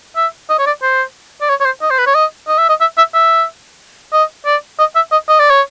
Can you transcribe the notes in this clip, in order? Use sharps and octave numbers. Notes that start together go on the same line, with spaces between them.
E5
D#5
C#5
D5
C5
D5
C#5
C#5
C5
D#5
C5
B4
C#5
D#5
D#5
E5
D#5
E5
E5
E5
D#5
D5
D#5
E5
D#5
D#5
D5
C#5